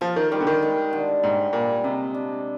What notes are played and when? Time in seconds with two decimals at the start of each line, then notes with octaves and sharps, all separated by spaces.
0.01 F3 F4
0.16 D#3
0.32 D#3 G3
0.40 D3
0.47 D#3
0.63 G#3
0.93 D3
1.23 G#2 G3
1.53 A#2 G3
1.84 C3 G#3
2.14 D4